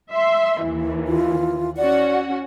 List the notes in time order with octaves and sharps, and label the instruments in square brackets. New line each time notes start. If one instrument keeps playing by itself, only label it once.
[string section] E5 C6
D#2 E3
[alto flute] F4
[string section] C#4 F#4 F#5 [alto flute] D5